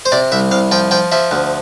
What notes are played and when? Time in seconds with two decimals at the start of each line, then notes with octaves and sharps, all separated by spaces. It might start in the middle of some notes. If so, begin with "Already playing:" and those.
0.05 C5
0.12 C3 D5
0.32 C2 E5
0.51 C2 F5
0.72 F3 G5
0.91 F3 G5
1.12 F3 E5
1.31 D2